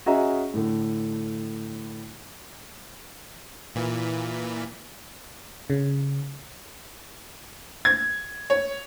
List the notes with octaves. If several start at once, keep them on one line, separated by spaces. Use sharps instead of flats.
C#4 F#4 G#4 D#5 E5 A#5
A2 D3
A#2 E3
C#3
G#6
C#5